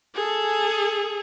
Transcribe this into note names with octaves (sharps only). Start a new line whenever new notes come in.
G#4 A4